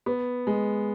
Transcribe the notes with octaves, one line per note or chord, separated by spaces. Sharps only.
B3
G#3